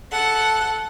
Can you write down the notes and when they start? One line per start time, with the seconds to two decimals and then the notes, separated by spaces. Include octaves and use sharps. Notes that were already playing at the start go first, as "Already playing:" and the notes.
0.13 A4 F#5